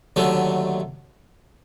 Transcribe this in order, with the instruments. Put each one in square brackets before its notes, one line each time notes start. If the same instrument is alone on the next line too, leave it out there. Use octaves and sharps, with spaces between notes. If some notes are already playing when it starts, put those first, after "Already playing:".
[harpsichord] D#2 D3 F#3 A3